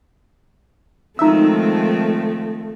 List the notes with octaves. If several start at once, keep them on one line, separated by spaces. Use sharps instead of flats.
D#3 F3 G#3 A3 C4 D#4 E5